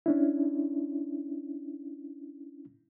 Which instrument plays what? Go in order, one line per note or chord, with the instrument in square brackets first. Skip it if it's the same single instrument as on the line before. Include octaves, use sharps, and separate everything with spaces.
[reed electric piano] C#4 D4 E4